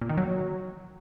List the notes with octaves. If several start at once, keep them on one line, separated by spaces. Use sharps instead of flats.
A#2
D#3
F#3